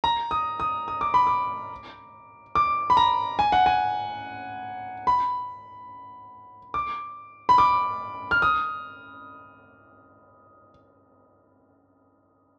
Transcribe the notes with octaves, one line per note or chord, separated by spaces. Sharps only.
A#5
D#6
D#6
D#6
D6
B5
D6
D6
B5
A#5
G#5
F#5
G#5
B5
D6
B5
D6
F6
D#6